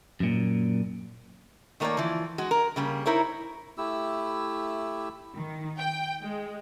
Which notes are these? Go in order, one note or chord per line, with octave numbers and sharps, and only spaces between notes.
F#2 A#2
D#3 A3 A#3 A#4 C#5 D5
E3 F3
G#3 F#4
A#4
C#3 G3 A#3
D#4 E4 A#4 C5 C#5
A3 E4 G4 E6
D#3
G5
G#3